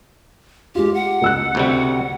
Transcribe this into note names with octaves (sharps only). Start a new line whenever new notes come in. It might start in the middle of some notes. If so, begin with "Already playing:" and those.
G#3 F4 G4
F#5
C#2 E6 F#6
D2 C3 G3